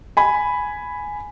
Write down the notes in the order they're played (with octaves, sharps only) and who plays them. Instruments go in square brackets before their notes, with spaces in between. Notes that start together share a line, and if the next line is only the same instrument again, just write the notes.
[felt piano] G#5 B5